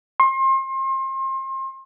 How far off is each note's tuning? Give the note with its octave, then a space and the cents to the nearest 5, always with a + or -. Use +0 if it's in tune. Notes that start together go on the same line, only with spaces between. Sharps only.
C6 +35